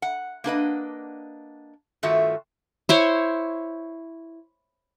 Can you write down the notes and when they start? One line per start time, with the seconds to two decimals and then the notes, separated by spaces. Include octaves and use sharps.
0.02 F#5
0.44 A#3 D4 B4 D#5
2.03 G2 D#3 A3 F4 F#4 E5
2.89 E4 C5 C#5